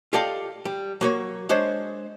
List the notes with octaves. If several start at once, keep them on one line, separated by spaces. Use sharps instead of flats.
F4 G4 A4 D5 D#5 F5
G3
F#3 A#3 C#5
G#3 D4 C5 C#5